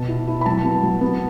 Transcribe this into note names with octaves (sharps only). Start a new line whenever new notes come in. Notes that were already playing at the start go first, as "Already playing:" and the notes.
Already playing: B2 A5
E4
E4
B5
F#3 A5
B3
F#3
B3